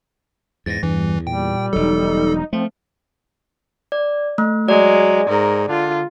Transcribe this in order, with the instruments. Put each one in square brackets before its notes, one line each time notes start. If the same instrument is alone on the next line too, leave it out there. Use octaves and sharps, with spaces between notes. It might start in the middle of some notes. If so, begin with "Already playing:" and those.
[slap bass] E2 G#2 [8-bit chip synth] A6 A#6
[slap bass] E2 [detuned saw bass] G2 [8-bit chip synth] E3
[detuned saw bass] A#2 [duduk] G3 [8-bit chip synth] G5
[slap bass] E1 F#3 [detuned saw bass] D#4 [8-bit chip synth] A4
[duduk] F3 [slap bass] A3 [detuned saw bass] C4
[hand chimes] D5
A3
[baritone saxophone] F#3 [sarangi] G#3 [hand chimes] D5
[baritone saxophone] G#2 [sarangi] A#4
[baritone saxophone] D3 [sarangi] F4